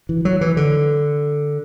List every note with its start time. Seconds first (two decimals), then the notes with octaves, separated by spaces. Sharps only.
0.09 E3
0.25 F#3
0.41 E3
0.57 D3